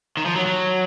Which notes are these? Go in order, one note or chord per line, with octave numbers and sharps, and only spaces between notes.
D#3
F3
F#3
F#3